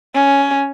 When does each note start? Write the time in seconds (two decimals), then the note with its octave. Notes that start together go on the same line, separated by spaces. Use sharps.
0.15 C#4